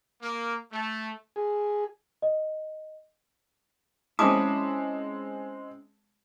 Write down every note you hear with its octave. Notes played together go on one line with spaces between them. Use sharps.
A#3
A3
G#4
D#5
G#3 C4 C#4 E4 A5 D6 D#6